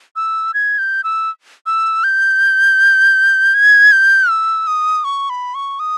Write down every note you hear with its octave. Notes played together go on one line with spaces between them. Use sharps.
E6
G#6
G6
E6
E6
G6
G#6
G6
E6
D#6
C#6
B5
C#6
D#6